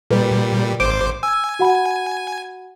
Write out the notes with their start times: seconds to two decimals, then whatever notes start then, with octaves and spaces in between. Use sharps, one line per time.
0.10 A#2 G3 A4 B4
0.80 G#1 C5 D6 D7
1.23 G#5 E6
1.59 F#4 F#5 B5